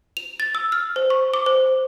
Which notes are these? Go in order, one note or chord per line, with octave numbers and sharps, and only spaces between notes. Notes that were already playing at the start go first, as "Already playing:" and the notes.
F7
A6
E6
F6
C5
C#6
D6
C5